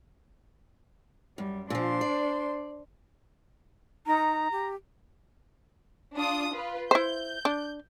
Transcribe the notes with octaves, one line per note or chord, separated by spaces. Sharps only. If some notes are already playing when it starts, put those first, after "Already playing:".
F#2 G3
A#2 F3 D4 C5 C6
D5
D#4 A#5
G4
D4 F4 D#6
F4 B4
E4 C5 G6
D4